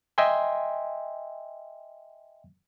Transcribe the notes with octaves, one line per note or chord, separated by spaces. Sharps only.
D#5 E5 G5 G#5 C6